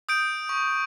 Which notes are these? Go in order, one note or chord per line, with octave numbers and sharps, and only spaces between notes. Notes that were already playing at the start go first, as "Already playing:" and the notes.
D#6 G6 D7
C#6